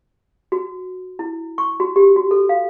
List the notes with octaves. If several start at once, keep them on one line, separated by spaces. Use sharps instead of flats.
F#4
E4
C#6
F#4
G4
F#4
A4
F5